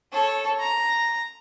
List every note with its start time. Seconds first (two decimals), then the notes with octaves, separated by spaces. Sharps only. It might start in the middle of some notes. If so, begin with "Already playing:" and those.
0.13 A4 C#5
0.59 A#5